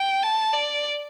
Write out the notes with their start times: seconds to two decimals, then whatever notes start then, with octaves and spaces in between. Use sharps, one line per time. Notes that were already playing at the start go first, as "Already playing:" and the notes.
Already playing: G5
0.23 A5
0.54 D5